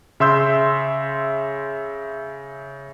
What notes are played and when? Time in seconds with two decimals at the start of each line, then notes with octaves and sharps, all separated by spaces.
0.20 C#3 E5 C6 E6 G6